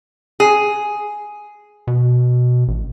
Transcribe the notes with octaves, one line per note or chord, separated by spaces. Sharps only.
G#4
B2
A1